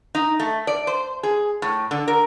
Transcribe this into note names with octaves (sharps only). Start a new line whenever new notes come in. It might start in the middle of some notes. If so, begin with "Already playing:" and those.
D#4
A3
D5
C5
G#4
A2
D3
A#4